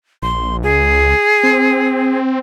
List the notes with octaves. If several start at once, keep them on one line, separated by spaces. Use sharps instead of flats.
A#1 C6
C#2 G#4
C4